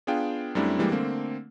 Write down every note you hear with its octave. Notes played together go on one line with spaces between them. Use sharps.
B3 D4 F4 G#4 F5 G5
F#2 G3 A3 C4 D4 E4
E3 G3 G#3 A#3 C4
D3 A3 A#3 C4